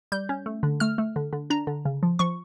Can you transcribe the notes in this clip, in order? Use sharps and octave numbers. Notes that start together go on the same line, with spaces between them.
G3 G6
C#4
A3
D3
A3 F6
A3
D3
D3
D4 A#5
D3
C#3
F3
F3 C#6